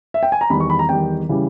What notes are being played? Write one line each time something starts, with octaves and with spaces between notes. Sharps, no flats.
E5
G5
G#5
A#5
E2 D#3 G3 B5
C#6
B5
A#5
E2 D#3 G3 G5
C#3 E3 G3